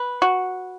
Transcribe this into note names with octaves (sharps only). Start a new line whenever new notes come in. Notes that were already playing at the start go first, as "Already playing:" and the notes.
Already playing: B4
F#4